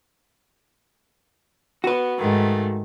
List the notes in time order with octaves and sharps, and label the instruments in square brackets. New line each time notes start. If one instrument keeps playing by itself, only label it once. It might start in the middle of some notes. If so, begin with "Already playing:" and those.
[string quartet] B3 [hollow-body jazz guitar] F#4 B4
[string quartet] G#2 D#3 A3